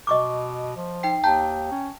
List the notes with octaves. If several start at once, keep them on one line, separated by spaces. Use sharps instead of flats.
B2 D#5 C#6 D6
F3
D#4 G5 C7
D#2 G5 A5 A#5 G6
C#4